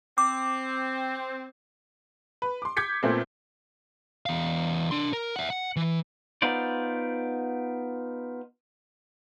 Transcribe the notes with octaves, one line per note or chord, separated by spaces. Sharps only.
C4 D6
B4
C6 D6
D6 G6 G#6 B6 C#7
A#2 A3 B3 C4 F4
E2 F5
D4 C6
A#4
E5 F#5
F#5
E3
B3 D#4 F4 C5 D5